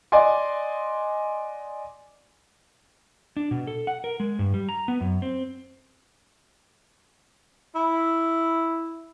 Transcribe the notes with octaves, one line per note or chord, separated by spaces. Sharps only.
D5 D#5 F#5 G#5 C6
D4
B2
A4
F#5
A#4
G#3
G2
G3
A#5
B3
F#2
C4
E4